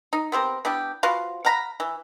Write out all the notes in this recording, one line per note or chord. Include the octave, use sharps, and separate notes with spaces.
D#4
B3 C4 G4 A#4
B3 D4 E4 G4
F3 F#4 B4 F5
F5 F#5 A#5 B5
E3